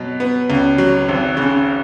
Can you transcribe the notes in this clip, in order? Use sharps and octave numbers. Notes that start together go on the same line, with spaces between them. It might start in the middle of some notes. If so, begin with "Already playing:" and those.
Already playing: B2 F#3
B3
C#2
F#3
G#1
C#3